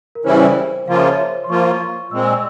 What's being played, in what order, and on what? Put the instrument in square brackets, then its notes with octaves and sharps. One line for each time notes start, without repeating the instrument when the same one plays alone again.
[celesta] A#4
[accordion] C#3 E3 G3 C#4 E4 [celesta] C5
[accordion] C#3 F3 A#3 F4 [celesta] F5
[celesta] E5
C#5
E5
C6
[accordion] F3 A#3 F4 [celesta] C#6
[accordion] A#2 G#3 C4 [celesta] E6
[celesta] E6